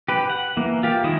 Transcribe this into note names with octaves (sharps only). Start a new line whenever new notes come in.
G4 B4
F#5
E3 A#3
F4 G4
D#3 G#3 E4 D#6